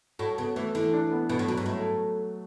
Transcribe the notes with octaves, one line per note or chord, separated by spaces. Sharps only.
A2 F#4
C#3 B3
E3 A3
D3 E3
D4
B3
B2 B3
A2
B2 F#3
G#2
A2 A3